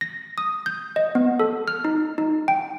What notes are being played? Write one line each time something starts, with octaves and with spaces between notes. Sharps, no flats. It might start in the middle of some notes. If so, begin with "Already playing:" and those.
A#6
D#6
G6
D#5
B3
A4
F6
D#4
D#4
G5